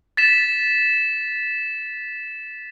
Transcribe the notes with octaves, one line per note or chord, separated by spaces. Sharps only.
A6 B6 E7